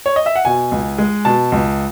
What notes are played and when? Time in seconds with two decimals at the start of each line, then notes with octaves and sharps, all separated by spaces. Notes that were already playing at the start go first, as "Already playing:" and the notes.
0.06 C#5
0.16 D#5
0.26 E5
0.36 F#5
0.45 B2 G#5
0.72 C#2
0.98 G#3
1.25 B2 A5
1.52 C#2